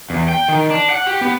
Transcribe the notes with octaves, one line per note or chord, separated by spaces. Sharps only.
E2
G5
D#3
D4
F#5
G4
B3